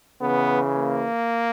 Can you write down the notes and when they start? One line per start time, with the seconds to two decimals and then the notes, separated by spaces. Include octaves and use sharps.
0.20 C#3 E3 B3
0.75 A#3